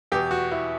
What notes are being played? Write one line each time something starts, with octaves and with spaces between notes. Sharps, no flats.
E2 B2 G4
F#4
E4